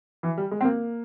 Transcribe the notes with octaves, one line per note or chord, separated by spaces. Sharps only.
E3
G3
G#3
C4
A#3